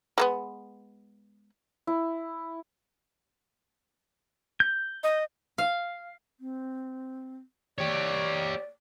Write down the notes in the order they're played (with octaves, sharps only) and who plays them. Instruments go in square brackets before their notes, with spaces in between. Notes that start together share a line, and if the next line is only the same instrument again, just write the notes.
[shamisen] G#3 A#3 B3
[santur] E4
[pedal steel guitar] G6
[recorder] D#5
[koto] F5
[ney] C4
[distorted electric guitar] G4 C#5 [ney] D5